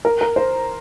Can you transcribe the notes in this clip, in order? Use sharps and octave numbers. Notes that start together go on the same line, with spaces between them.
A#4
A#4
C5